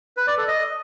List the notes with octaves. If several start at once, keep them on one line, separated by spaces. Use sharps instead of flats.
B4
D5
A4
D#5